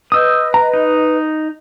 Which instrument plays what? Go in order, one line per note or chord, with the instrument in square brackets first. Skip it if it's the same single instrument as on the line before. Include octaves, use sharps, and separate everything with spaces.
[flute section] B4 D#5 [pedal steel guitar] D#6 E6 G6
[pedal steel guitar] A#5
D#4